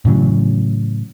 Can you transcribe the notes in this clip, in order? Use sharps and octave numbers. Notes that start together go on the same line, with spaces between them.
A2 C#3 E3 F#3